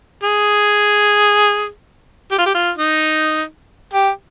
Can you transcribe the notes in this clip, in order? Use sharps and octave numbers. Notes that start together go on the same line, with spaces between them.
G#4
G4
F4
G4
F4
D#4
G4